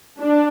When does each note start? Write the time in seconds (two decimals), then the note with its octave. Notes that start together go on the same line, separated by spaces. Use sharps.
0.20 D4